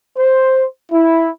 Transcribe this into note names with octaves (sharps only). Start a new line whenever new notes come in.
C5
E4